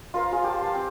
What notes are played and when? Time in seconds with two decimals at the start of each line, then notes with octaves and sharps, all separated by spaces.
0.14 F4 A#4 C5 F5
0.31 F4 G#4
0.44 G4 A5
0.61 A5 C6
0.74 C4